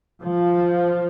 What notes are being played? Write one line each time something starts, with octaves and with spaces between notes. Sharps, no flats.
F3